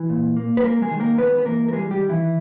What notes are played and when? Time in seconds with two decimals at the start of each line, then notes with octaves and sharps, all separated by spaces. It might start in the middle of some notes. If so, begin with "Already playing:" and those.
Already playing: E3
0.09 A#2
0.37 A#3
0.57 B4
0.64 G#3 A#3 A#4
0.82 G#3 G#4
0.91 D#3
1.00 A#3 A#4
1.18 G#3 B3 B4
1.38 B4
1.45 E3 A#3 A#4
1.68 A#4
1.73 G3 G#3 G#4
1.91 G3 G4
2.00 D#3
2.09 E3 E4